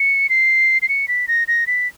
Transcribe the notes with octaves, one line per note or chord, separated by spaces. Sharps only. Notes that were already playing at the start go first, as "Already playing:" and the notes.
Already playing: C#7
C7
C7
C#7
B6
A#6
A#6
B6